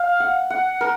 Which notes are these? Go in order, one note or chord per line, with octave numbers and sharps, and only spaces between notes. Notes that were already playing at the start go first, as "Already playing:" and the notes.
Already playing: F5
F#5
F#5
A#4